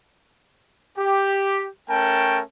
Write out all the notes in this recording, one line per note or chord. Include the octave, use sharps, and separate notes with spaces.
G4
A3 C#4 A#4 G5 A5